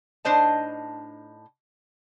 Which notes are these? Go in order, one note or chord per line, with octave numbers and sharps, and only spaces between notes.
A2 D4 D#4 C5 D#5 A5